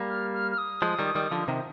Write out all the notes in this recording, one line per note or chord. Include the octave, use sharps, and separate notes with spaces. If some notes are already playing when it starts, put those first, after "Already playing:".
Already playing: G3 A#3
F6
F6
F6
D#6
F3 G#3
D#3 G3
D#3 G3
D3 F3
C3 D#3